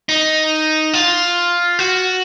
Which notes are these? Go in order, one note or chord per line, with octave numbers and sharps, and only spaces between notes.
D#4
F4
F#4